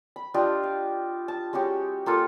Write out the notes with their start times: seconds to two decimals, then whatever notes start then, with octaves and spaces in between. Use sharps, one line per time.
0.16 B5
0.34 D4 F4 G4 D#5
0.63 F5
1.28 A5
1.53 G#3 C#4 F#4 G4
2.06 A#3 F4 A4